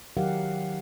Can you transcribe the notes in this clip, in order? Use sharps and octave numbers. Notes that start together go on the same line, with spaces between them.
D#3 F#3 G4 A#4 F5 F#5